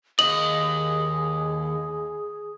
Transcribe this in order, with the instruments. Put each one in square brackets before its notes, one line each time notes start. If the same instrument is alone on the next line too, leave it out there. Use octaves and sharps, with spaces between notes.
[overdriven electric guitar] D#2 D#5 [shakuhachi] G#4 [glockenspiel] D#6 [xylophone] F#7